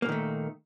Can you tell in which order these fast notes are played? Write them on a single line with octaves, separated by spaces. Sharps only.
A#3 A#2 D#3 A3